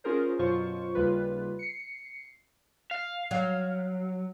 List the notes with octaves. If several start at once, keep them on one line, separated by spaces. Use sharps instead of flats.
C#4 F4 G#4 A#4 C5
F#2 B2 F#3 F4 C5 C#6
D#2 C#3 G3 F4 B4
C7 C#7
F5
F#3